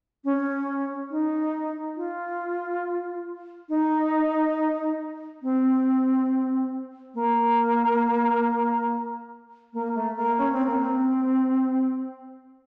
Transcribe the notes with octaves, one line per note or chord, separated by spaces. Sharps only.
C#4
D#4
F4
D#4
C4
A#3
A#3
A3
A#3
C#4
C4
A#3
C4